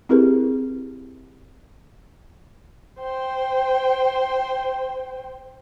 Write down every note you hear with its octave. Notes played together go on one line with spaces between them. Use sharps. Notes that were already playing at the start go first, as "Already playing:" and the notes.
C4 E4 G4 G#4 A#4 B4
C5 G5